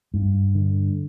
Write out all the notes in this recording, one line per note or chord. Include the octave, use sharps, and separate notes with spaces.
G2
D3